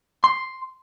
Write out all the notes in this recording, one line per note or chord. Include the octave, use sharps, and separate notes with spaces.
C6